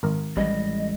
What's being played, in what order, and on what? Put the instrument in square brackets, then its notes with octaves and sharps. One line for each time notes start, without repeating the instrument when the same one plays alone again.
[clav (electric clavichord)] G#1 A#4
[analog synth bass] A1 [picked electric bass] G3 G#3 [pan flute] D#5